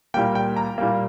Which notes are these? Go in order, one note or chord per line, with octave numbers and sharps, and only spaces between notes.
A#2 G3 A#3 G5
G5
A#5
A#2 G3 A#3